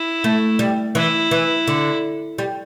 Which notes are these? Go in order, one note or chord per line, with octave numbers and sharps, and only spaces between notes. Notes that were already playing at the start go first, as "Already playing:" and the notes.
Already playing: E4
A3
G3
E3 E4
E3
D3
G3